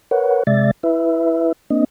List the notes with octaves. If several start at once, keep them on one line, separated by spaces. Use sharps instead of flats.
A#4 B4 C#5 F#5
C3 G#3 D5 E5 A6
E4 B4 E5
A#3 C4 D4 D#5